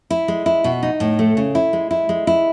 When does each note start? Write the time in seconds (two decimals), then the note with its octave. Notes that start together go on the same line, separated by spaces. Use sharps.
0.10 E4
0.28 G#3
0.46 E4
0.64 B2
0.83 D#4
1.00 A2
1.19 A3
1.37 C#3
1.55 E4
1.73 G#3
1.91 E4
2.09 G#3
2.27 E4